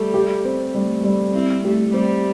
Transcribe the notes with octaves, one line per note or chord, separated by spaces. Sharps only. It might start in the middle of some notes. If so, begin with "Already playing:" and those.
Already playing: G3 A3
G4
C4
G3 A3
G3
C4 E4
A3 G4
G3 C4